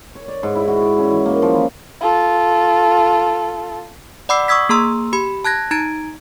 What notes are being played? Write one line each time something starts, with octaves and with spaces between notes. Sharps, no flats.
C#5
D5
G#2
E4
F#4
D6
C#4
E3
A#3
F3
E3
F4 A4
D5 F#5 B5 D6 E6 C7
C#6 D#6 E6 G#6 B6
A#3 G#4 A#5 C6 E6
G4 B5
A5 F#6 G#6 A#6
D#4 A#5 G#6 D7